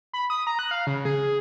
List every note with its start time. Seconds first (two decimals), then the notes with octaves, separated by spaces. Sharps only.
0.13 B5
0.30 D#6
0.47 A#5
0.59 F#6
0.71 F5
0.87 C#3
1.05 G#4